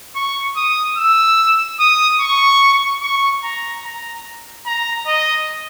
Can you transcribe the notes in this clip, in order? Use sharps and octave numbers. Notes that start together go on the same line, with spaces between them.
C#6
D#6
E6
D#6
C#6
C#6
A#5
A#5
A#5
D#5